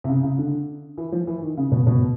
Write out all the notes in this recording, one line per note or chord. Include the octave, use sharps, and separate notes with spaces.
C3
C#3
C#3
D3
E3
F3
E3
D#3
C#3
B2
B2